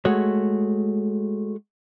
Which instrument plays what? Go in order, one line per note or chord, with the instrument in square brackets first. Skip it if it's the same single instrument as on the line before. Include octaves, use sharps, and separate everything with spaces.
[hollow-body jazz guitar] G#3 A3 F#4 C#5